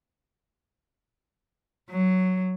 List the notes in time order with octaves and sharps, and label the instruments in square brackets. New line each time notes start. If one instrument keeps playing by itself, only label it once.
[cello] F#3